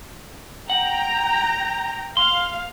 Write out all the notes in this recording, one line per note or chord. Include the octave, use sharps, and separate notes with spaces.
F#5 G5 A#5
F5 C6